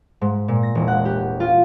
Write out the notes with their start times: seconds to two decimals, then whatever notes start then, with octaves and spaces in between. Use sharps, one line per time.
0.21 G#2
0.48 A#2
0.63 A#6
0.75 E1
0.88 F#5
1.05 G4
1.40 F4